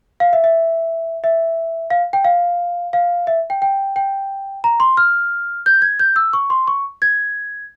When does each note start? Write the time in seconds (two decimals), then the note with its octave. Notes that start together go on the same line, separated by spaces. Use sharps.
0.20 F5
0.33 E5
0.44 E5
1.24 E5
1.90 F5
2.13 G5
2.25 F5
2.93 F5
3.27 E5
3.50 G5
3.62 G5
3.96 G5
4.64 A#5
4.80 C6
4.97 F6
5.66 G6
5.82 G#6
6.00 G6
6.16 E6
6.33 C#6
6.50 C6
6.68 C#6
7.02 G#6